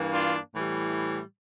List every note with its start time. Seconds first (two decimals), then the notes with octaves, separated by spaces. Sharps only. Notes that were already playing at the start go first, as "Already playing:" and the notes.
Already playing: G2 E3 A#3
0.12 D4 F4
0.54 A2 E3 G3